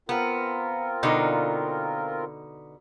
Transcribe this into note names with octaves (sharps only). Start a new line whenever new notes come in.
B3 C4 F4 A#4
B2 D3 D#4